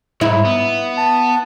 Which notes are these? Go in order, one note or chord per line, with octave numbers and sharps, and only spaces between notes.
C2 G#2 E4
B3
A5